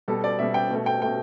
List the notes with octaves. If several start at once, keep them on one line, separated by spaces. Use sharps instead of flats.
B2 G3 A4
D5
B2 G3 E5
G5
B2 A3
G5
B2 A3 G5